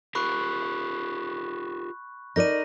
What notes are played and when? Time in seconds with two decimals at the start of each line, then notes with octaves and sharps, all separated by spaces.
0.15 F4 G4 A#4 B5 C#6 F#6
2.36 D#4 A#4 D5 A#6 D#7